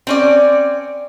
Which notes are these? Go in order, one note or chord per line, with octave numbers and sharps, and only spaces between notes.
C4 C#4 D5